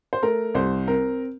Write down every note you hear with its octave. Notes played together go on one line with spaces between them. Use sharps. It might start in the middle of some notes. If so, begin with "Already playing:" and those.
C5
A3 A#4
C2 C5
C4 A#4